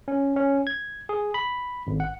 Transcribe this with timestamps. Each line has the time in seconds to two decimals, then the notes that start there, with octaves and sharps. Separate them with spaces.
0.08 C#4
0.36 C#4
0.67 G#6
1.09 G#4
1.34 B5
1.87 G#1
2.00 F#5